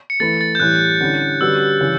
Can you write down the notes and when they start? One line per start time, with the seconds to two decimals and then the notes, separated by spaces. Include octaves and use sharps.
0.10 C#7
0.20 E3 A3 E4 B4 A6
0.41 A6
0.55 G6
0.60 A2 E3 G3 F#6
1.00 D3 G3 C#4 E4 G4
1.41 D3 G3 C#4 F#4 B4 E6
1.81 C#3 E3 G3